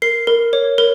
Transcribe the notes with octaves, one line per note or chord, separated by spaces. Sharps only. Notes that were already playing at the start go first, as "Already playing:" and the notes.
A#4 C7
A#4
C#5
A#4